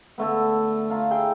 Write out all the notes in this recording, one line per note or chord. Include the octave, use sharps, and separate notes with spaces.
D3 A3 B3
F4 A#5
E4 G#4 G5